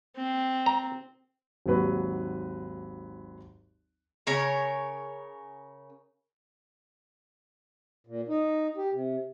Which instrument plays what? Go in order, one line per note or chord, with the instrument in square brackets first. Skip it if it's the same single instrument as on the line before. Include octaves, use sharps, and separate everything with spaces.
[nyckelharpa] C4
[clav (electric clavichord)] A#5
[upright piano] G#1 D#2 F#3 B4
[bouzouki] C#3 A#4 C#5
[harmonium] A#2
D#4
G4
C3